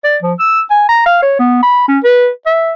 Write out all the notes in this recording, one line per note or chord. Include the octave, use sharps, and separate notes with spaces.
D5
F3
E6
G#5
A#5
F5
C#5
B3
B5
C#4
B4
E5